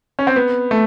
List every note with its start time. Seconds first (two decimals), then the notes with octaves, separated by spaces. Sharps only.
0.19 C#4
0.27 C4
0.36 B3
0.71 A3